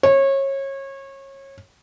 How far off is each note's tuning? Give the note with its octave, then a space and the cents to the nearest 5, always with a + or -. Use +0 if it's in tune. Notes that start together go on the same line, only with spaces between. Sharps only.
C#5 -25